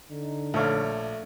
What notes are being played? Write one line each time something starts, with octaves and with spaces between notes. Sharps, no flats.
D3 D#4
A#1 A3 C#5 D5 E5 F5